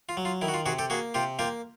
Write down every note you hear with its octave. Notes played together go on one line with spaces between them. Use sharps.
F4
F#3
F4
D#3 E4
F#4
F4
C3 F#4 G#4
G4 A4
A#3 F#4 G#4
C3 F4 G4
A#3 F4 G4